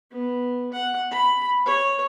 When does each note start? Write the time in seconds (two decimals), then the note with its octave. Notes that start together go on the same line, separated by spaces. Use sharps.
0.11 B3
0.72 F#5
1.11 B5
1.65 C#5